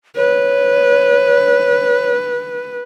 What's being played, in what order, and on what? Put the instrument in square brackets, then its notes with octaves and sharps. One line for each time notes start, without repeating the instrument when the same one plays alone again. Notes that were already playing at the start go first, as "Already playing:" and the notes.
[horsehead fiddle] B4 [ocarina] C#5